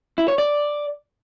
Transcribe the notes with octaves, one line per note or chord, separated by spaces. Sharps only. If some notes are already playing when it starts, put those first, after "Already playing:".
E4
C#5
D5